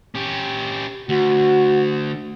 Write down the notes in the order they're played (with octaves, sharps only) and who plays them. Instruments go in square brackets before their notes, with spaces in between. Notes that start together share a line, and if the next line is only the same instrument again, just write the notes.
[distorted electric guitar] C#4 G4
[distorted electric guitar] D2 [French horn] F#4